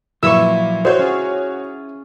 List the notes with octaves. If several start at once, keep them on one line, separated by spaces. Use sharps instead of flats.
A#2 F3 F#3 E4 B4 C#6 E6
F#4 C5 C#5
C#4 F4 G#4